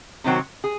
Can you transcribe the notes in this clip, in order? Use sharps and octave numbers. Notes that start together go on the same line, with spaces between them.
C3 D#3 F#3 C4 F#4
G#4